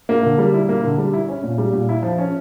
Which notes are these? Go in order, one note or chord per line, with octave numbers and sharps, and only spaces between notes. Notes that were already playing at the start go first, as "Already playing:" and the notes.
A#3
D3
G3
E4
A#3
D3
G3
E4
C#4
A#2
G3
A#2
E4
F3
C#4